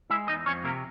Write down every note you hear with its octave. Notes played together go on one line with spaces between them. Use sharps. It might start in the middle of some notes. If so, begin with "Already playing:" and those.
G#3 E4 E5
E2 D#4 D#5
F2 C#4 C#5
C3 A#3 A#4